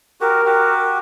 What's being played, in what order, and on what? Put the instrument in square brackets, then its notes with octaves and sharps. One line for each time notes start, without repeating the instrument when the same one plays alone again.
[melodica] F#4 G4 [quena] A#4
[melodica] F#4 G4